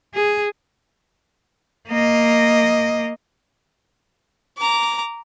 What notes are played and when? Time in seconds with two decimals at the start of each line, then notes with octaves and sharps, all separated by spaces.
0.14 G#4
1.88 A#3 D#5
4.58 A#5 D6